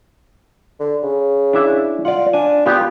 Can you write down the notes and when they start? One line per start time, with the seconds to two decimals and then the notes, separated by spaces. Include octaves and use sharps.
0.80 D3
1.03 C#3
1.53 D4 E4 E5
2.05 F4 D5 F#5
2.33 D4 G#5
2.66 B3 F4 G4